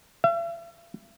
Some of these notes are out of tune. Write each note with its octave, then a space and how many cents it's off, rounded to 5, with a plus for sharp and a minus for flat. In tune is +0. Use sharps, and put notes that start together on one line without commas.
E5 +45